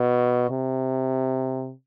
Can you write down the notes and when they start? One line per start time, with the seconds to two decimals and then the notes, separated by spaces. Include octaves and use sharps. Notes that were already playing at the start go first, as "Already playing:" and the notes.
Already playing: B2
0.50 C3